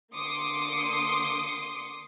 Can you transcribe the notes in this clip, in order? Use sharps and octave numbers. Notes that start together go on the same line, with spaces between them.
D3 A#3 C6 D6 D#6 C#7